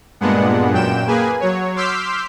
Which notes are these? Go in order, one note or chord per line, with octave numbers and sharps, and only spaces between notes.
G2 A#2 G#3 B3 D4 F#5
F#2 A#2 G5 E7
A#3 G#4 B4 G#5
F#3 C#5
C6 D6 E6 F6 G6 B6